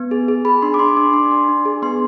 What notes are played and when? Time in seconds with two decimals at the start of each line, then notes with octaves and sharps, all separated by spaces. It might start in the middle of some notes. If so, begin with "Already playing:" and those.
Already playing: B3
0.11 G#4
0.28 G#4
0.45 G#4 B5
0.62 D4 C6
0.74 D6
0.79 D4 C6
0.97 D4 D6
1.13 D4 C6
1.31 D4
1.49 D4
1.65 G#4
1.82 B3 C6